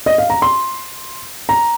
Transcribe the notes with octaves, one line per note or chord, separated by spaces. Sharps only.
D#5
F5
A#5
C6
A#5